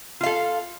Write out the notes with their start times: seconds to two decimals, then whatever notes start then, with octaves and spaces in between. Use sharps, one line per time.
0.21 F4
0.23 F5
0.26 A4